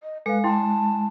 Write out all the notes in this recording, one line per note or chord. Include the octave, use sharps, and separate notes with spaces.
D#5
G#3 A4 B4 F5
E4 G5 A5 C6